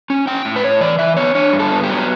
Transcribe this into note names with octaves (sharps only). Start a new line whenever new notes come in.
C#4
C#4 G5
A2
B4
A2 C#5
E3 D5
E3 E5
B3 C#5
D4 C#5
G2
A4
B3
G4
F#3